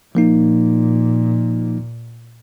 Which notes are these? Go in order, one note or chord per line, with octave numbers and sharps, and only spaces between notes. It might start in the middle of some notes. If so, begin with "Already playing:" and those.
A#2 F3 A#3 D#4